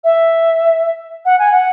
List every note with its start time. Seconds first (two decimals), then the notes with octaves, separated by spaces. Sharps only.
0.04 E5
1.25 F#5
1.39 G#5
1.52 F#5